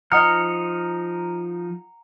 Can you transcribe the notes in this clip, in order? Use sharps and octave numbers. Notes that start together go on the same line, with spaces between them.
F3 D#4 D#5 F#5 A#5 D#6 F6 C#7